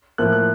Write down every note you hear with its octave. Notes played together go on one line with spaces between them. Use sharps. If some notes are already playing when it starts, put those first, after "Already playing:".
A2 F3 A#3 F#6
F#6